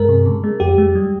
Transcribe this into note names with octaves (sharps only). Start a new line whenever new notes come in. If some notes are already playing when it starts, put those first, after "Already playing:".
Already playing: G2 G#3 A#4
C3
C#3
G#3
F2 G4
G#3
G3